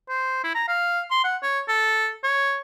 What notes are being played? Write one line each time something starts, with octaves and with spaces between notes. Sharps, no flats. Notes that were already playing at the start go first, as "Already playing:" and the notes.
C5
E4
A#5
F5
C6
F#5
C#5
A4
C#5